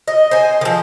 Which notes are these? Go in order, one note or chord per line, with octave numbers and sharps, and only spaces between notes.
D#5
C5 G#5
D#3 F3